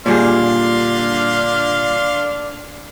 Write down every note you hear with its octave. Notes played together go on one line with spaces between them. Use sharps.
A#2 D3 G3 D4 G#4 F5 C6